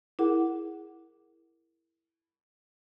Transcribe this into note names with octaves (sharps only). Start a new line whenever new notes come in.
E4 G#4 A#4 F#5